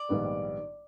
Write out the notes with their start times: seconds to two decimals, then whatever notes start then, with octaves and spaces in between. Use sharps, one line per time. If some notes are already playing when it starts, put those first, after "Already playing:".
Already playing: D5
0.09 A#1 G#2 D#3 G3 B3